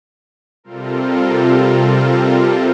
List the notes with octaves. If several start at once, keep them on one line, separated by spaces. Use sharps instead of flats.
C3 G3 C4 F4 A4 A#4